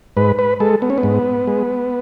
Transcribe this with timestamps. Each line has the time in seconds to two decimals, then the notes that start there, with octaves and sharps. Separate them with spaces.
0.17 G#2 B4
0.39 B4
0.60 G#3 A4
0.82 B3
0.90 C#4
0.98 B3
1.03 G#2
1.47 G#3